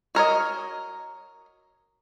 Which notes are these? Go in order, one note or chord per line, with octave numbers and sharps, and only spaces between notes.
F#4 A#4 C#5 D#5